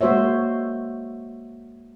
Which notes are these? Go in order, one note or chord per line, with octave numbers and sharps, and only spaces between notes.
G#3 A#3 F#4 C5 C#5 E5